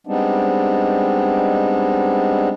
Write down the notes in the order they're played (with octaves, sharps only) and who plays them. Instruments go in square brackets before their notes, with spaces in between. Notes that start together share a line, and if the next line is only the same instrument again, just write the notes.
[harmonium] G3 G#3 B3 C4 D4 D#4